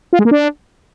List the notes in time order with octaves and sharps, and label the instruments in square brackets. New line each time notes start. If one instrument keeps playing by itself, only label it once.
[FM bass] F4
G#3
A#3
D4